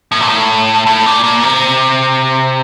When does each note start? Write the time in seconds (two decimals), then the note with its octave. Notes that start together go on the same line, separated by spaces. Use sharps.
0.12 A2
0.20 A#2
0.28 A2
0.87 A2
1.06 A#2
1.24 A#2
1.43 C3